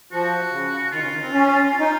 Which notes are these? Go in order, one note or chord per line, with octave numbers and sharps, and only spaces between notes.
F3 F#4
C#3
D#3 F4
C#3
D#3
C4
C#4
F4
D#4